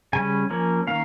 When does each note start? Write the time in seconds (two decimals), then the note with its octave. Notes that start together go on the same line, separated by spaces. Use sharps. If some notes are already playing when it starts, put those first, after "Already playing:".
0.13 C#3 G3 C#4 G#5
0.50 F3 A#3 C#4
0.87 D#3 A#3 C#4 F5